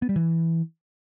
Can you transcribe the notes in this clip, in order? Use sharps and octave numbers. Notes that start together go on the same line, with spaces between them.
B3
G3
E3